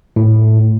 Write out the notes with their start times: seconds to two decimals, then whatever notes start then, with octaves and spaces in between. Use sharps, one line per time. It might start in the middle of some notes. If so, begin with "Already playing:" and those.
0.16 A2